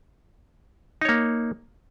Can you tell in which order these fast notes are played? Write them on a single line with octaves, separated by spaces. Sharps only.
D#4 C#5 A#3